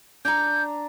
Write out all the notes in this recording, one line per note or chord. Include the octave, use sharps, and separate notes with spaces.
D4 A#5 G6